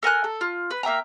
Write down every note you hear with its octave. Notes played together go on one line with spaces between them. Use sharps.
A4 A#4 G#5 F#6
A4
F4
B4
A#3 E5 G5 A#5